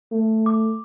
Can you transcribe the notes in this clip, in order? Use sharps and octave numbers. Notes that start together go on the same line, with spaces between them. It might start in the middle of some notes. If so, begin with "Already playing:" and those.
A3
D6